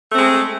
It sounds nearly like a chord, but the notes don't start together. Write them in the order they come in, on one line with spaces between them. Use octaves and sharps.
A3 C4 G#3